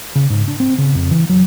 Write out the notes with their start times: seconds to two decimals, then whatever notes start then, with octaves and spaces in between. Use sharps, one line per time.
0.15 C#3
0.30 G#2
0.48 D4
0.60 C4
0.78 C#3
0.95 F2
1.11 E3
1.29 F#3